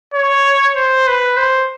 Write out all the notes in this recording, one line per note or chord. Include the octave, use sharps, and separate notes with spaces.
C#5
C5
B4
C5